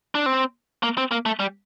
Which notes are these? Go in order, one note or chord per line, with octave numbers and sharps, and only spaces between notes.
D4
C4
A#3
C4
A#3
A3
G3